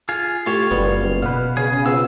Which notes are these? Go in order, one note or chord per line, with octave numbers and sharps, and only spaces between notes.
F4 G#4
A3 E4 F4 G4 C#5
F#1 G3 B3
B2 B4 F5
C#3 G#4
B3 C4 F4 E6